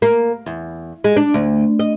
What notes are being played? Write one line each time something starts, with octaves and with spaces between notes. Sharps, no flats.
A#3
E2
G#3
D4
D2
D#5